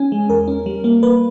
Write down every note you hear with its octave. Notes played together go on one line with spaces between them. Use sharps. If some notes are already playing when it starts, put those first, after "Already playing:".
Already playing: C#4 G#5
G#3
E2 A#4
C#4
G3
A#3
A#3 B4